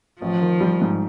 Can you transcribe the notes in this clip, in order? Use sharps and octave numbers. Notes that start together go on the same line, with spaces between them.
A1 F3
D#3
G3
G#2